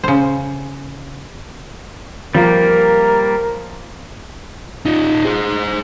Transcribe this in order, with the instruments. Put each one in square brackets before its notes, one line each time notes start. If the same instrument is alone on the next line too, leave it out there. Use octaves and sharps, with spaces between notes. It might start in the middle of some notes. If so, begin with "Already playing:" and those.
[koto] C#3 C5
[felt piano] F3 [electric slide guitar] G3 A#3 [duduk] A#4
[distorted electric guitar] D#4 F4
G#4 C5